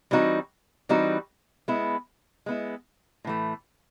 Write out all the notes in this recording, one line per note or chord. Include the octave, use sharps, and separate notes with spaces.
E3 G3 C4 D#4 F#4
E3 G3 C4 D#4 F#4
G#3 B3 E4
G#3 B3 E4
A2 E3 A3